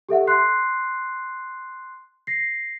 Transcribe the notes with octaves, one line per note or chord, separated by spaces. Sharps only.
G4 A4 E5 F#5
C6 F#6 C7
A#6 C7